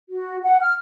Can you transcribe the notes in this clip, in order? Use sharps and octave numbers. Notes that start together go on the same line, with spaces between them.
F#4
F#5
F6